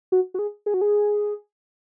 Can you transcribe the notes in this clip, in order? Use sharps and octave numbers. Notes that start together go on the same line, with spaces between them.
F#4
F#4
G#4
G#4
F#4
G#4